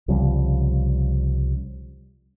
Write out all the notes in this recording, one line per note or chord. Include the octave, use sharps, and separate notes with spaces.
C2 C#3 F3 G3